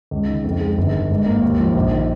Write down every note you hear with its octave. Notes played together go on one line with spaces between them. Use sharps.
C#2
D#3
F2
G#3
G1
D#3
G#2
A#3
D#2
F3
A#1
D#3